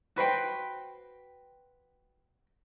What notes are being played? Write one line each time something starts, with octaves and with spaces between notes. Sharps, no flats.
F#4 B4 C5 G5